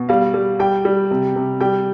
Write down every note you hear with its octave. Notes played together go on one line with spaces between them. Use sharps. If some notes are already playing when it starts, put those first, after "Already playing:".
Already playing: B2
G3 F5
G3
G3 G5
G3
C3
C3
G3 G5